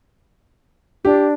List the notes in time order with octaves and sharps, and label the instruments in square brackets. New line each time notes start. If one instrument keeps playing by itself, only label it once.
[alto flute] D4 [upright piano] G4